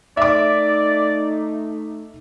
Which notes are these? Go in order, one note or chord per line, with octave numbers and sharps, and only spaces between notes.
A3 D#4 D5 E5 D6